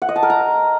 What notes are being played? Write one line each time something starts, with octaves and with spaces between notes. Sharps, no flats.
F#5
D#5
A5
A#4
A#5